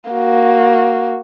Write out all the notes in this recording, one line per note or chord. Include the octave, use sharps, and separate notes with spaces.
A#3 F#4